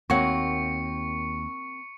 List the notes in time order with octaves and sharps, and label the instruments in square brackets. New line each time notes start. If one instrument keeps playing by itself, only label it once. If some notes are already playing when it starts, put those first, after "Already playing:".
[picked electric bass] D#2 [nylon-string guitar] A#3 C4 [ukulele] F#4 C#5 F#5 [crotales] C#6 C#7